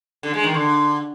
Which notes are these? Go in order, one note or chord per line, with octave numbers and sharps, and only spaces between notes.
D3
G#3
D#3
D3